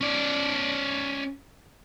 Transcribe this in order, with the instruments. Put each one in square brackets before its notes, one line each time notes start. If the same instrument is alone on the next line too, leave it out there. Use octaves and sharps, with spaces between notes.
[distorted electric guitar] C#4 D5